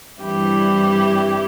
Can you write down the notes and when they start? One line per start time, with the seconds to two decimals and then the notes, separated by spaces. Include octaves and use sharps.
0.22 G2 E3 G3 C4 E4 G4